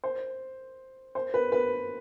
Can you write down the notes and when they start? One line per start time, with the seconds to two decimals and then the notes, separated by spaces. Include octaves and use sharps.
0.04 C5
1.15 C5
1.34 B4
1.52 B4